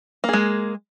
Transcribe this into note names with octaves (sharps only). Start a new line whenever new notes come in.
G#3 A#3 G#4